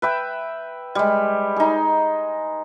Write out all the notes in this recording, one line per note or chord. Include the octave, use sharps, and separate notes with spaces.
B4 E5 G5
G3 G#3
D#4 G#4